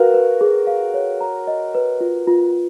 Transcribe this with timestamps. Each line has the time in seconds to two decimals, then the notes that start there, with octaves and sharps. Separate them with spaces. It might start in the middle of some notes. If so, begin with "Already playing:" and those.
Already playing: F#4 A#4 B4 F5
0.14 B4
0.41 G#4
0.67 F5
0.94 C#5
1.21 A#5
1.47 D#5
1.75 B4
2.00 F4
2.27 F4